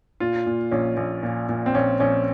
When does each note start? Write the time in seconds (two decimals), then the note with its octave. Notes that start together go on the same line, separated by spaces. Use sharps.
0.20 A#2 F4
0.46 A#2
0.71 A#1 C#4
0.97 A#1
1.23 A#2
1.49 A#2
1.66 C4
1.74 A#1 C#4
2.00 A#1 C#4